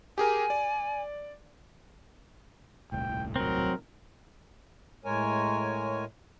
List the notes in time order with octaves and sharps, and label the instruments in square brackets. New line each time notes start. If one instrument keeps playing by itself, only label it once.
[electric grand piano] G4 G#4 A#4 [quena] G#5
[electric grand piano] D5
[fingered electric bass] D#1 C2 A2 [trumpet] G5
[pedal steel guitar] F#3 C4 [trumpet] A#4
[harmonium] A2 G#3 A#4 C#5 G#5